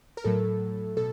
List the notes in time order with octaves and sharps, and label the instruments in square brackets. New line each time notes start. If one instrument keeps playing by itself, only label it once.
[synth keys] A#4
A2 F#3 A3 A4
B2 A4